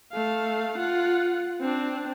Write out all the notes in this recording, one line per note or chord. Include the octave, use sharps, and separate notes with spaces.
A3 F5
F4 F#5
C4 D4